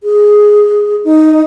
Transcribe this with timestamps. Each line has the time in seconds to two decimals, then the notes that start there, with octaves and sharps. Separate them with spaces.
0.03 G#4
1.05 D#4